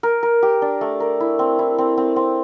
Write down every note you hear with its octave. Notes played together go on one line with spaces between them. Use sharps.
A#4
A#4
G4
D4
A3
A#4
E4
C4
E4
C4
C4
C4